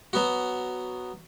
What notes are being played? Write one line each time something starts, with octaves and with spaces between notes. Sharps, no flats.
F#3 B3 F#4